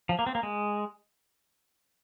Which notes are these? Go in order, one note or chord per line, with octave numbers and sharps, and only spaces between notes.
F3
A#3
C4
A#3
G#3